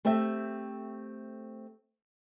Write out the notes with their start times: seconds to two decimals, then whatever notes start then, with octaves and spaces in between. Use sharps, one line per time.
0.05 A3 C4 G4 A4 E5